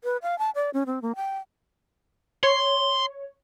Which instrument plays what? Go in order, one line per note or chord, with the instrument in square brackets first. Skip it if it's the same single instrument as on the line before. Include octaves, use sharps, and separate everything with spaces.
[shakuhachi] B4
F5
A5
D5
C#4
C4
A#3
G5
[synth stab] C#5 [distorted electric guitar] C6